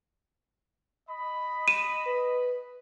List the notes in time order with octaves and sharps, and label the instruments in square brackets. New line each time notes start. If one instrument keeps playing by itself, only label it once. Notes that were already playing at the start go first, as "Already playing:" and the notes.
[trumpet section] D#5 B5
[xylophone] D#7 E7
[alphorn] B4